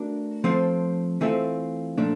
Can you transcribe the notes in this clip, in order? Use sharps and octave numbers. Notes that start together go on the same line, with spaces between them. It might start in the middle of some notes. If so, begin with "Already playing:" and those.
Already playing: A3 D4 F#4 A#4 D5
F3 A3 C4
E3 A3 C4 F4 A4
A#2 F3 A3 D4